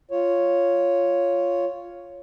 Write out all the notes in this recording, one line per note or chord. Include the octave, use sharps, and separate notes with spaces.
F4 C#5